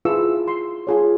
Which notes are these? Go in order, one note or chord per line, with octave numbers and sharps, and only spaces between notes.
E4 F4 G#4 B4 C#6 E6
C6
F4 G#4 C#5